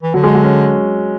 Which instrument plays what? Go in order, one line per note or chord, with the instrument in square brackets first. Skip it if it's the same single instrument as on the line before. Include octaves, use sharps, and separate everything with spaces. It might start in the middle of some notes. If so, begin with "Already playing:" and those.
[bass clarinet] E3
[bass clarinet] D3 [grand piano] F#3
[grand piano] G#3
F#3
C#4